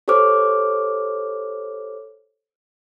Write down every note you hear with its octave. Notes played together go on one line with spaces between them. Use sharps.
G4 A4 C5 C#5 D6 F6